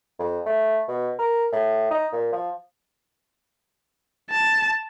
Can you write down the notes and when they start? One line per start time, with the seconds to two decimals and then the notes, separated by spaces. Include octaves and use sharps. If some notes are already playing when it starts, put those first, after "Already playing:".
0.19 F2
0.46 A3
0.88 B2
1.19 A#4
1.53 A2
1.91 D#4
2.12 A#2
2.32 F3
4.30 A5